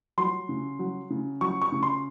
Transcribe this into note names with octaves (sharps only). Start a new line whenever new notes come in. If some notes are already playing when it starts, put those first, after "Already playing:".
F#3 C6
C#3
F#3
C#3
F#3 C#6
C#6
C#3
C6